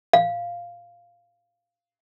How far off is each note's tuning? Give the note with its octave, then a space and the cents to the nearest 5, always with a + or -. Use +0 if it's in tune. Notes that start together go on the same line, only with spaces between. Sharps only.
F5 -5